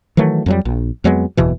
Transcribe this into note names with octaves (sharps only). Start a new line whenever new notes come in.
D#3 E3 F#3 A3
F2 F#3 G3
A#1
F2 F#3 G#3 B3
F#1 E2 B2 E3